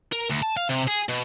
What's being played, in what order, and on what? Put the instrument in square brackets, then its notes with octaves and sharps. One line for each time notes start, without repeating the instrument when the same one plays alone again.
[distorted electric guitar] A#4
D2
A5
F5
C3
G#4
B2